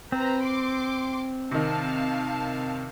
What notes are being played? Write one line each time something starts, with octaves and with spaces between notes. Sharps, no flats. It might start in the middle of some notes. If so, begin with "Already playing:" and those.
C4 B4 C5 A#5
C6 D6
C3 D#3 F5 A5